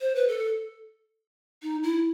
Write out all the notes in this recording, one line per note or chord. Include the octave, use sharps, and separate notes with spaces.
C5
B4
A4
D#4
E4